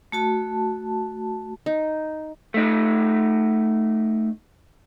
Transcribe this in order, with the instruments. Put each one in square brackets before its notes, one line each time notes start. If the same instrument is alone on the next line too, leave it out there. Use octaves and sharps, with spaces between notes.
[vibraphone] A3 F#4 A5
[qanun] D#4
[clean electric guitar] A3 D#4